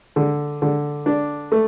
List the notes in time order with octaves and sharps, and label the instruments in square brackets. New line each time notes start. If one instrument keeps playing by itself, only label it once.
[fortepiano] D3
D3
D4
A3